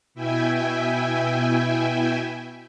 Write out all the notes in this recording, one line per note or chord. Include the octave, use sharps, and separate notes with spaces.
B2 E4 E5 G5 G#5